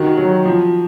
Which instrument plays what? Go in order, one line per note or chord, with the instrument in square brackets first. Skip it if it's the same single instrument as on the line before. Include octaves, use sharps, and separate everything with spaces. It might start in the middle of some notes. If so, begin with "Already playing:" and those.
Already playing: [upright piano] D#3 [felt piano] F#4
[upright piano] F#3
F3